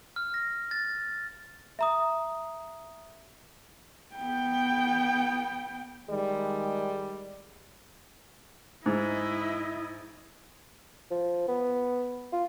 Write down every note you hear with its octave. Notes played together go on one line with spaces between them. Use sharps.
F6
A#6
A6
E5 A#5 D#6
B3 G5
D#3 G3 G#3
G#2 E4 D#5
F3
B3
F4